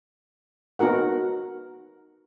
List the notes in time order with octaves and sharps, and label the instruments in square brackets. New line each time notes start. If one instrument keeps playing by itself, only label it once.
[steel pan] B3 D#4 F#4 A#4 F#5